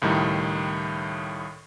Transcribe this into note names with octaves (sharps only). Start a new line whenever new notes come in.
C#2 A2 D#3 G3